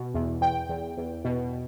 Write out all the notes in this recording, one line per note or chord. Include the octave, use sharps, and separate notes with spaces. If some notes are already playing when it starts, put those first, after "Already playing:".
Already playing: B2
E2
E2 G5
E2
E2
B2